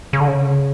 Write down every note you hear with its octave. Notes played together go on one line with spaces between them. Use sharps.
C#3
D3
C#3